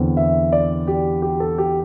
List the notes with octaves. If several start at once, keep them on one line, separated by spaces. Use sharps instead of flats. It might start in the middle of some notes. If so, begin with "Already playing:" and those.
Already playing: E2 D3 C4
E5
D5
G4
G4
A4
G4